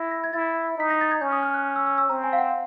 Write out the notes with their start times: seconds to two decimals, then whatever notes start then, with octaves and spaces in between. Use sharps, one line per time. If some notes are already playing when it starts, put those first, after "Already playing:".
Already playing: E4 A#6
0.11 A#6
0.24 G#6
0.33 E4 A6
0.78 D#4 B6
0.90 A#6
1.01 A6
1.11 G#6
1.21 C#4 G6
1.32 D#6
1.43 F6
1.54 F#6
1.76 E6
1.87 E6
1.98 E6
2.09 C4 A#5
2.23 G#5
2.33 F5
2.38 F#5